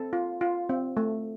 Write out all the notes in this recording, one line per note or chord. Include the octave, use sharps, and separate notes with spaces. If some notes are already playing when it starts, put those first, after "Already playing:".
Already playing: C4 A4
F4
F4
C4
A3